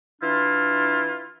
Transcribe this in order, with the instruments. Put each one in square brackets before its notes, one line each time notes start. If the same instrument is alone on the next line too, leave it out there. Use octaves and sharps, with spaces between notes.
[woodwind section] E3 D4 E4 F4